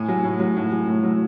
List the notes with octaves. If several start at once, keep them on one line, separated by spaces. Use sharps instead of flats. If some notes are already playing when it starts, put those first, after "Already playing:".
Already playing: A2 G#5
F#3
A2
F#3
A2
F#3
A2
F#3